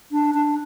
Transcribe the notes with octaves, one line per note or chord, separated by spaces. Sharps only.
D4
D4